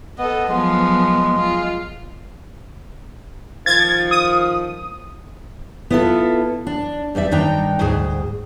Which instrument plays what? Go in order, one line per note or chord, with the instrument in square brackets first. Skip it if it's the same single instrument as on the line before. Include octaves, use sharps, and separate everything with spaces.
[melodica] B3 [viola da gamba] A4 D#5
[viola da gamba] F3 F#3 B3 [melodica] G#3
[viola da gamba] F4
[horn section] D#3 F3 [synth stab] G#6 A6
[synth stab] D#6
[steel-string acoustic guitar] B3 E4 F4 G#4 A4
D4
E2 G3 D5 E5
G2 D#3 D4 D#4 G5 A#5
D2 G#2 G#4